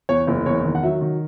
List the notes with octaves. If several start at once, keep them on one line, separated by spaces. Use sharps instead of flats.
E2 C#5
F#1
E2 C#5
D#3
F#5
F#3 E5
D#3